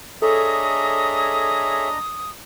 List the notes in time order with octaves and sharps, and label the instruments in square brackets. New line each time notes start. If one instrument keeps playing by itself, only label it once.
[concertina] D4 D#5 A#5 [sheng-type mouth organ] G#4 C#5 E5 [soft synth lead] A4 [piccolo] D#6